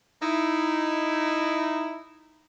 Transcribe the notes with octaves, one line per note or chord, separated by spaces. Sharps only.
D#4 E4